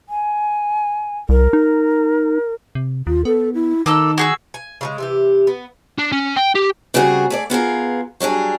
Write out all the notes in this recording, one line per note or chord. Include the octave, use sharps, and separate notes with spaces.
G#5
C2 A#4
D#4
C3
D#2 F4
B3 A4
E4
D#3 A#3 D#4 A4 E6
F#4 G#4 E6
G#5
C#3 F#3 G#3
C3 E3 G4
B3
D4
C#4
G5
G4
C#3 G3 C4 F#4 G#4
A3 G#4 D5
B3 F4 G#4 A#4
F#3 G3 D4 G#4